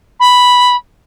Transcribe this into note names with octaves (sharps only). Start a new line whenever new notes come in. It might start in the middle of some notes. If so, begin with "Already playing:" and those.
B5